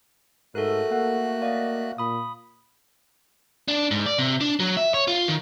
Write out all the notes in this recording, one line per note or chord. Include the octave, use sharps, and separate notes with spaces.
G#2 A3 F#4 A4 A#4 F#6
A#3 F#5
D5 D#5 F5
A#2 B5 D#6
D4
G#2
D5
C3
D4
F#3
E5
C#5
F4
D#3